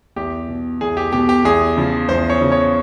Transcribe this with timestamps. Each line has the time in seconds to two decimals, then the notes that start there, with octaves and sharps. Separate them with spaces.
0.16 E2 G4
0.49 B2
0.81 E2 G#4
0.97 G4
1.13 B2 G4
1.29 G4
1.45 E2 G#4
1.77 C#3 F3
2.09 E2 C5
2.29 C#5
2.41 C#3 F3
2.52 C#5